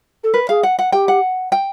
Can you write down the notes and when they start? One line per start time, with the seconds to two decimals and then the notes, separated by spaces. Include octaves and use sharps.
0.24 A4
0.34 A#4 B4
0.49 G#4 F5
0.63 F#5
0.79 F#5
0.92 G4 G5
1.08 F#5
1.52 G5